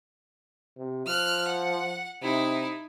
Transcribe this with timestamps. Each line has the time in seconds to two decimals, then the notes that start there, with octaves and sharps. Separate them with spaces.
0.77 C3
1.06 F3 F6 F#6
1.48 F#5
2.22 C3 D#4 E4